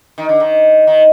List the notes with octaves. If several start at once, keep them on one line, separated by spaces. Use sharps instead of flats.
D#3
D3
D#3
D#3